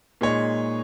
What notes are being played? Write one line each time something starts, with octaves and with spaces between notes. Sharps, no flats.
A#2 G#3 D#4 G#4 C#5